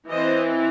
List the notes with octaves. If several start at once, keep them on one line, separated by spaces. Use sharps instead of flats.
E3 C4 C5 D#5